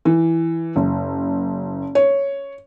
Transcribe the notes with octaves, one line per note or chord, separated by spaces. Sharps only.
E3
F#1
C#5